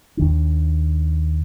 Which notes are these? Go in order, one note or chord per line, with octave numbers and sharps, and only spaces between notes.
D#2 D#3 D4